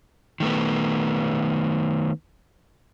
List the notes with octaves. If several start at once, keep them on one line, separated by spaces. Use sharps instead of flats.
D#3 A3 B3